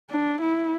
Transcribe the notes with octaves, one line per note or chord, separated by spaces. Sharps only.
D4
E4